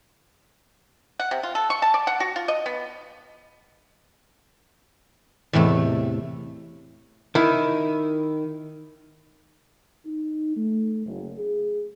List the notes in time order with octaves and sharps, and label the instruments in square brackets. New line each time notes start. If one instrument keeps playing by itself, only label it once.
[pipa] F#5
C3
F4
A4
C#6
A5
D5
F#5
F#4
F4
D#5
B3
[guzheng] E2 A2 C3 A3
[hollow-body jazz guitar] D#3 E4
[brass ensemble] D#4
A3
F#1
G#4